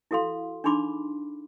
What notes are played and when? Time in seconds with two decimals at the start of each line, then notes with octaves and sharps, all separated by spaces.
0.11 E4 F#4 A4 F5 C6
0.64 D4 D#4 G#4 B5 C6 D6